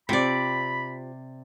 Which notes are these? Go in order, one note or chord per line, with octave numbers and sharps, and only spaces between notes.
C3 C4 F4 G4 D5 B5